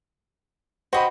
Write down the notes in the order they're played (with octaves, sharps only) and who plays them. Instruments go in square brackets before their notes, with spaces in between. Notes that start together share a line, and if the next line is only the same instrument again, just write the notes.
[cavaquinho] F#4 G5 [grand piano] C5 D#5 B5